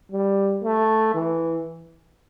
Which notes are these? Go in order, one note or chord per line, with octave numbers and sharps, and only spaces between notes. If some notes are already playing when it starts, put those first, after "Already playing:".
G3
A3
E3